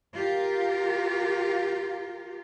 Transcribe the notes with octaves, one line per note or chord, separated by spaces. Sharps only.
F4 G4 A#4